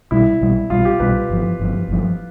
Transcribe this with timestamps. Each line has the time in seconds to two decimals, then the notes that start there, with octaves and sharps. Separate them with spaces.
0.11 B1 B2 G3 E4
0.41 B1 B2 G3
0.70 B1 B2 G3 F4
0.85 G4
1.00 B1 B2 G3 B4
1.29 G1 G2 F3
1.59 G1 G2 F3
1.88 G1 G2 F3